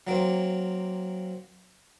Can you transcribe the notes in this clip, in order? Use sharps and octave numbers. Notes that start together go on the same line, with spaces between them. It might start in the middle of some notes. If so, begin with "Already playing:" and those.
F#3 A#3 C4